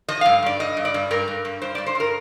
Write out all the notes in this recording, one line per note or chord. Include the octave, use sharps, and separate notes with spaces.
F3 D#5
G2 F5
G2 D5
G2 D#5
G2
D5
G2
G2 A#4
G2
G2
G2 C5
G2 D5
C5
G2 A#4